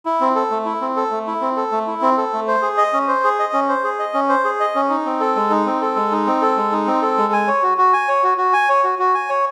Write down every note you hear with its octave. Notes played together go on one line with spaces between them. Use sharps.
E4
C4
A4
A3
E4
C4
A4
A3
E4
C4
A4
A3
E4
C4
A4
A3
C5
G#4
D#5
C#4
C5
G#4
D#5
C#4
C5
G#4
D#5
C#4
C5
G#4
D#5
C#4
D#4
C4
A4
G#3
D#4
C4
A4
G#3
D#4
C4
A4
G#3
D#4
C4
A4
G#3
G#5
C#5
F#4
F#4
G#5
C#5
F#4
F#4
G#5
C#5
F#4
F#4
G#5
C#5